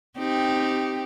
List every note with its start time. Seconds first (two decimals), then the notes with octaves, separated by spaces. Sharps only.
0.17 C4 D#4 G4